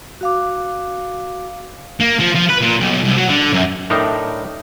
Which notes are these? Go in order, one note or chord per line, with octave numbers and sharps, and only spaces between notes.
F#4 F5 D6
A#3
F3
F3
B4
A#2
B1
C2
F#3
D3
F#2
A2 D4 D#4 A#4 G5